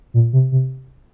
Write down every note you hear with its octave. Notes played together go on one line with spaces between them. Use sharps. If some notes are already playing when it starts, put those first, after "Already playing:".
A#2
C3
C3